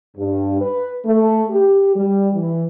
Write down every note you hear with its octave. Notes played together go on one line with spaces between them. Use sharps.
G2
B4
A3
G4
G3
E3